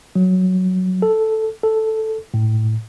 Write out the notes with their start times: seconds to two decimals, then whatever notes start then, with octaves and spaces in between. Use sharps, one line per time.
0.16 F#3
1.02 A4
1.63 A4
2.34 A2